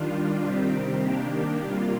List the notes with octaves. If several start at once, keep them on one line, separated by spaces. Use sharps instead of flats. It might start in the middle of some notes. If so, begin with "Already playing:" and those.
Already playing: D#3 G3 D4 F4
C3 D#3 G3 C4 G4
D#3 A#3 D4 G4
C3 G3 A#3 F4